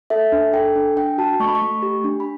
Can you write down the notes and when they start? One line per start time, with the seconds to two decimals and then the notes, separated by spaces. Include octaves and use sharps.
0.10 A4 E5
0.32 D4
0.53 A4 G5
0.76 D4
0.97 D4 G5
1.18 F#4 A5
1.40 A3 C#6
1.47 B5
1.55 C#6
1.62 A3
1.82 G4
2.04 D4
2.20 B5